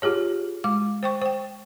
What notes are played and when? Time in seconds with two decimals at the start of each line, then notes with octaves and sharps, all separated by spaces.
0.02 F4 G4 G#4 C#5
0.64 G#3 D6
1.03 C5 G5 C#6
1.22 C5 G5